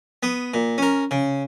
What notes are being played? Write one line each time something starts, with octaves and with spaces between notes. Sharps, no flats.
B3 D#6
A#2
C#4 A#4
C#3